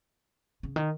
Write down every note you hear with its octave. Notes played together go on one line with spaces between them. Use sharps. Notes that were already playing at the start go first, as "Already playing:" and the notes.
C#3
D#3